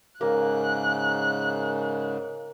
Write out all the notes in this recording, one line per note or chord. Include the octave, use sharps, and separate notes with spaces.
G#2 C#3 A#3 F#6